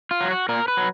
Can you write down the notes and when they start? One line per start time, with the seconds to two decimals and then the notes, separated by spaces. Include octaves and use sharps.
0.11 F4
0.21 F#3
0.31 F#4
0.49 A#2 A#4
0.68 B4
0.77 F#3